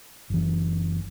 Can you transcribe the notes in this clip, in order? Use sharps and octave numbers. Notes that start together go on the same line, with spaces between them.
F#1 E3